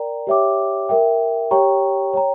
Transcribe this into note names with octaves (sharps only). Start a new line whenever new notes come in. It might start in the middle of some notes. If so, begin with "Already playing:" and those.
Already playing: A#4 D5 G5 A#5
G4 C#5 E5 G5 D6
A#4 E5 G5
G4 C#5 G5 A#5 C#6
C#5 G5 A#5